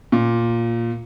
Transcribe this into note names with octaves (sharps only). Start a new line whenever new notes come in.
A#2